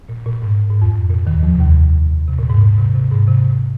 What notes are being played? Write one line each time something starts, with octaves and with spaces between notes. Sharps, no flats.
A#2
A#2
G#2
A#2
G#2
F2
A#2
D#2 D#3
F2 F3
C3
D#2 D#3
C3
A#2
G#2
A#2
C3
C3
G#2
C3